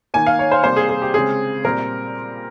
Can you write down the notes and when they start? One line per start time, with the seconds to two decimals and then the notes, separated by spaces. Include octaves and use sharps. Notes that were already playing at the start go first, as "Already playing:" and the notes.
0.14 D#3 A#3 G#5
0.27 F5
0.39 C#5
0.52 C5
0.64 C3 G3 A#3 C5
0.76 G#4
0.89 G#4
1.02 G4
1.14 C#3 G#3 C4 G#4
1.64 A#2 G3 C4 A#4